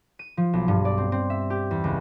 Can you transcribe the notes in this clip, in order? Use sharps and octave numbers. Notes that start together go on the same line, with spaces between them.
D#7
F3
B1
G2
D5
C4
C4
E5
G4
E2
C#2